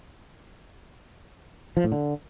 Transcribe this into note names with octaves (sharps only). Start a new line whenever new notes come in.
F3
A2
D3